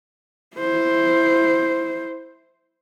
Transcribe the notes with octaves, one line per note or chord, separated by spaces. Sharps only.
E4 C5